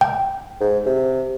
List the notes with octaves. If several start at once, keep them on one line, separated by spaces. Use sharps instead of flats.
G5
G#2
C3